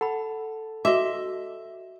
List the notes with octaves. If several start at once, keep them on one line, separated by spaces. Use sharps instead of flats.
A4 F#5 B5
F#4 D#5 E5 D6